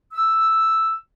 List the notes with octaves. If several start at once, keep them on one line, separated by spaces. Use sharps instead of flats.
E6